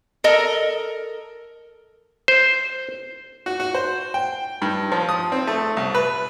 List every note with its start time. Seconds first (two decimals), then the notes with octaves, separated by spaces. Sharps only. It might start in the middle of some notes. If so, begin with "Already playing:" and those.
0.24 A4 A#4 D#5
2.28 C5
3.46 F#4
3.60 F#4
3.75 C5
4.14 G5
4.62 G2
4.92 F3
5.09 D#6
5.32 C4
5.47 A3
5.77 C2
5.95 B4